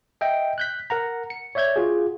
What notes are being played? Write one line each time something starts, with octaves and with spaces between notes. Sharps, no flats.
D#5 E5 G5
F#6 G6 B6
A#4 F#5 A#5
C#7
C#5 D5 E5 G6 G#6
F4 F#4 G#4